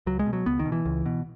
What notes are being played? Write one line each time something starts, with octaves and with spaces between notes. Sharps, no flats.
C#2 F#3
G#3
B2
F#3
C#2 B3
D#3
B2
E3
C#2
B2